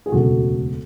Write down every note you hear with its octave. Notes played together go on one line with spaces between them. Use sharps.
G#4
E1 D2 C#3 F#4 A4